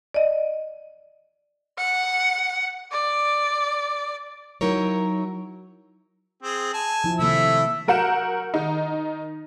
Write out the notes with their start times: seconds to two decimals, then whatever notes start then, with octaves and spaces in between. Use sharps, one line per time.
0.14 D5 D#5
1.78 F#5
2.92 D5
4.61 F#3 D#4 E4 A#4 C#5
6.43 C4 G#4
6.74 G#5 A5
7.04 F3 E4
7.19 C3 D#3 A3 A#3 E4 E6
7.88 F#3 A#4 F#5 G6 E7
8.54 D#3 D#4